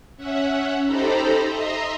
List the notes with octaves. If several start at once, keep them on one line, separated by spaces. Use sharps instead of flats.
C#4 E5 F#5
D#4 G4 A4 C5 A#5 B5
D#5 E5 A#5 C6